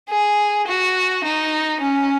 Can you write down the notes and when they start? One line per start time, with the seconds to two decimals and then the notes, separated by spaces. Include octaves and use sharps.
0.09 G#4
0.67 F#4
1.25 D#4
1.81 C#4